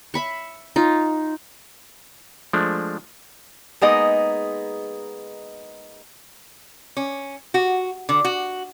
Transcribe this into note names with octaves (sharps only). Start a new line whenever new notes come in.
E5 B5 C#6
D#4 F4
F3 G#3 A3 D4
G#3 A#3 B3 D#4 G#4 D#5
C#4
F#4
D3
F#4